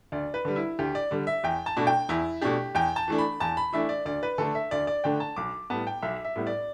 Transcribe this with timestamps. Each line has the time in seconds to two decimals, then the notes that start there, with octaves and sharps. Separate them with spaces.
0.12 D2 D5
0.34 B4
0.45 D3 G3
0.56 E4
0.79 D2 G4
0.95 D5
1.11 D3 G3
1.27 E5
1.44 E2 G5
1.66 A5
1.77 B2 A3 D4
1.87 G5
2.09 E2 E4
2.41 B2 A3 D4 G4
2.75 E2 G5
2.96 A5
3.08 E3 A3 D4
3.18 B5
3.40 E2 A5
3.57 B5
3.73 E3 A3 D4 E5
3.89 D5
4.05 D2 D5
4.23 B4
4.38 D3 A3 D4 A4
4.55 E5
4.71 D2 D5
4.87 D5
5.04 D3 A3 D4 G5
5.20 A5
5.36 B1 D6
5.70 A2 G3 B3 A5
5.87 G5
6.02 B1 E5
6.25 E5
6.36 A2 G3 B3
6.47 D5